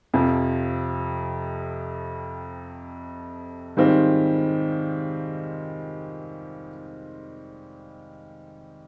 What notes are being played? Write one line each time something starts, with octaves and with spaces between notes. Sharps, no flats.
F2 C3 F3
G#2 D#3 G3 C4 F4